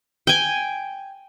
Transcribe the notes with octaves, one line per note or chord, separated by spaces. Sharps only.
G5 G#5